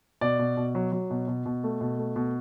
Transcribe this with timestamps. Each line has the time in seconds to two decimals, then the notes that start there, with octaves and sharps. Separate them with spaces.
0.21 B2 D5
0.39 B2
0.57 B2
0.75 F#3
0.92 F#3
1.10 B2
1.27 B2
1.46 B2
1.64 A3
1.81 B2
1.99 A3
2.16 B2